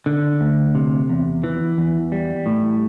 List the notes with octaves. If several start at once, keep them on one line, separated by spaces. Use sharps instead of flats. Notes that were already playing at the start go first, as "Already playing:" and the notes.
D3
D2
C3
E2
E3
E2
G3
A2